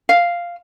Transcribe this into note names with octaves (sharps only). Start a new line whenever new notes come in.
F5